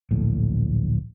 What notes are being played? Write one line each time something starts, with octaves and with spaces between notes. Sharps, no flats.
D1 A#1 A2